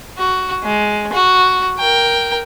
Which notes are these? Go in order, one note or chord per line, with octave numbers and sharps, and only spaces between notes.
F#4
G#3
F#4
A#4 G5